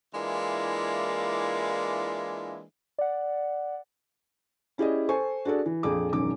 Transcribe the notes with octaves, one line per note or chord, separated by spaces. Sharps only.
E3 G#3 A#3 D4 E4 F4
D5 F#5
C#4 E4 G4 G#4 D5 D#5
A4 C5 G#5 C#6
D4 F#4 G#4 A4 D5
E3
A#1 F2 G#4 D6
E1 F#2 D#3 D6